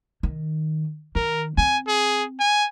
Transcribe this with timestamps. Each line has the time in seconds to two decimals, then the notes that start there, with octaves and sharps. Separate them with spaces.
0.23 D#3
1.15 D#3 A#4
1.58 C4 G#5
1.88 G#4
2.40 G#5